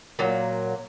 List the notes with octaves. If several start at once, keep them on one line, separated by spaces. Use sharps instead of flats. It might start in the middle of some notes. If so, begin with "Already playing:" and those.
A#2 F#3